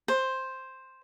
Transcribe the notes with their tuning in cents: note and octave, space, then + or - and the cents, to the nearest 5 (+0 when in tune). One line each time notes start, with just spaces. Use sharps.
C5 +5